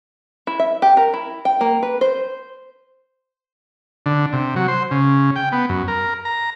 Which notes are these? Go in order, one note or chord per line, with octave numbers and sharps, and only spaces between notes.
E4
E5
G4
A#4
E4
G5
A#3
B4
C5
D3
C3
F#3
C5
C#3
G5
B3
F#2
A#4
A#5